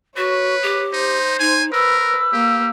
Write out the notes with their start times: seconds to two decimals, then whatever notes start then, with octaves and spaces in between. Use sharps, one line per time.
0.17 F#4 B4 C#5
0.62 G4
0.93 D#4 C5
1.39 D#4 G#5
1.73 A#4 B4 E6
2.33 A#3 G4